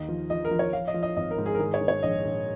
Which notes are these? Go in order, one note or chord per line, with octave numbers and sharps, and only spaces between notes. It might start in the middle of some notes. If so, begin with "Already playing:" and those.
Already playing: D#2 D#3 D#5
F3
F3 D#5
A#4
F3
C#5
F3 F5
D#5
F3
D#5
G#1 D#5
A#4
G#2
G#4
A#4
D#3 G#4
C#5
D#3
C#5
A#1 D#5
A#1